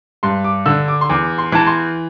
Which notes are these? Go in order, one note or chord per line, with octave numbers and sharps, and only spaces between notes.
G2 C6
D6
D3 E6
D6
C6
E2 D6
C6
E3 A5
C6